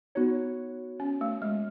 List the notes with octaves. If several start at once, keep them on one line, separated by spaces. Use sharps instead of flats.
B3 D#4 F#4 C#5
C#4
A3
G#3